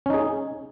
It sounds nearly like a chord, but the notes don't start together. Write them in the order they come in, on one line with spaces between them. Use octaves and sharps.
C#4 D#4 G#4